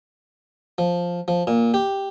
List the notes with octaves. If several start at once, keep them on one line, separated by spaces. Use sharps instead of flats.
F3
F3
A#2
G4